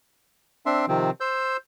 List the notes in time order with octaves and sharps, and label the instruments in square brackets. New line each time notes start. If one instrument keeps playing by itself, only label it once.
[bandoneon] C4 D4 E5 C6
C3 D#3 F3 C4
C5 E6 G6